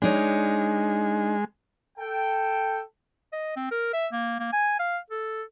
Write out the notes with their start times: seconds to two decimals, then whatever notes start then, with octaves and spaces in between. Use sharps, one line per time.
0.02 G#3 D4 D#4 C#5
1.98 A4 G5
3.33 D#5
3.56 C4
3.71 A#4
3.93 E5
4.12 A#3
4.39 A#3
4.53 G#5
4.79 F5
5.10 A4